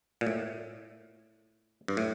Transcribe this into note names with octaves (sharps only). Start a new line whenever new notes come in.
A#2
A2
G2
A2